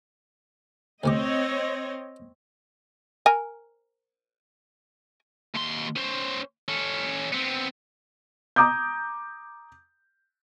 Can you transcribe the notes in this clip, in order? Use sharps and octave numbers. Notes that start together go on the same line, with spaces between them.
D2 C3 C4 C#5 D#5 D6
A#4 G#5
D#2 C6
C#4 C5
C#4 A4
B3 C4
A#5 D6 D#6 G6